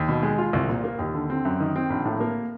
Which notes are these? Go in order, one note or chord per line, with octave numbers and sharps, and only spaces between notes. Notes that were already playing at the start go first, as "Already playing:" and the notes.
Already playing: D#2
B2
G#3
F4
C2
A#2
A#3
D#2
D3
C4
F#2
D#3
C4
A#1
A2
A#3